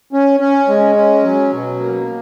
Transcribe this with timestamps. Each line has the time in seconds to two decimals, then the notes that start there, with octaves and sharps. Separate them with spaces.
0.13 C#4
0.40 C#4
0.68 G#3
0.96 C#4
1.23 F#3
1.52 B2
1.79 A#3